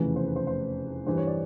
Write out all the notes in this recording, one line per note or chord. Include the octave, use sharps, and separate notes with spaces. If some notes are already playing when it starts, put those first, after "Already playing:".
Already playing: F1 E2 C#3 E3 A3 B4
C5
B4
C5
C5
G2 E3 G3 C5
C#5
D5